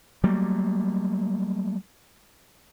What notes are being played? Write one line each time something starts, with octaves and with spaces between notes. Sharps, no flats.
F#3 G3 A3 A#3